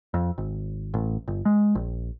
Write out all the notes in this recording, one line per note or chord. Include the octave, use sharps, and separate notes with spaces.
F2
G#1
A1
G1
G#3
A#1